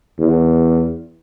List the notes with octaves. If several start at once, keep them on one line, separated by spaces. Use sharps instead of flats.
E2